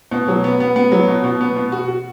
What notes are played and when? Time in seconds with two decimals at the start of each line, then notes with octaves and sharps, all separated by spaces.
0.11 B2
0.28 F#3
0.44 B3
0.60 B3
0.76 B3
0.92 F#3
1.08 B2
1.24 B2
1.41 B3
1.56 B2
1.72 F#4
1.88 F#4